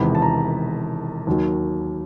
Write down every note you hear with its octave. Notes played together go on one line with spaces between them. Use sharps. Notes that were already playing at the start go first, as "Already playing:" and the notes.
Already playing: E1 E2 C3 D#3 B5
A5
A#5
D#2 D#3 F#3